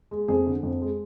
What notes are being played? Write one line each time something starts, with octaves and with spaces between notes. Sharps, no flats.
G#3
F2 G#4
D3
F2
G#3